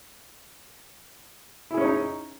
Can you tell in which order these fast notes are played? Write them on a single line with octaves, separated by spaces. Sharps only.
E4 G#4 C#4 C#5 D#4